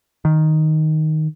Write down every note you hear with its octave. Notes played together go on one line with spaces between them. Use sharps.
D#3